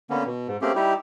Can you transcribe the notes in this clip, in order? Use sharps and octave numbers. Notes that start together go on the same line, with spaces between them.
D3 A#3 B3 C#4
B2
G#2
A3 A#3 C4 C#4 G4 G#4
G3 D#4 E4 G4